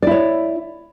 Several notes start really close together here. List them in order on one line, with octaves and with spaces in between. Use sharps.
D5 E4 C#5